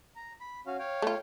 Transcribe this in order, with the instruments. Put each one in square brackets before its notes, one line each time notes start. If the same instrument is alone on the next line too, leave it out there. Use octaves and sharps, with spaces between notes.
[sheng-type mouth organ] A#5
B5
C#4 F#4 F5
C#5 F5 G5
[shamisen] A3 F4